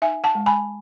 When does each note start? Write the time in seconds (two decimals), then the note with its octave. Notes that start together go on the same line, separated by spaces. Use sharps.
0.02 D#4 E5 G#5
0.24 F#5 A5
0.35 G#3
0.46 G#5 B5